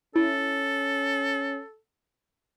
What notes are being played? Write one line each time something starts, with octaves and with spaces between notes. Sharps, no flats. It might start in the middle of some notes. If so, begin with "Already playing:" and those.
C#4 E4 A4